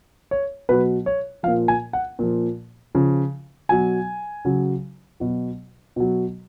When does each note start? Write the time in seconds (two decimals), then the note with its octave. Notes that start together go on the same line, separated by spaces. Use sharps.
0.31 C#5
0.69 B2 F#3 B4
1.06 C#5
1.43 F3 F5
1.48 A#2
1.68 G#5
1.93 F#5
2.19 A#2 F3
2.95 C#3 F3
3.69 B2 F#3 G#5
4.45 C#3 F#3
5.20 B2 F#3
5.96 B2 F#3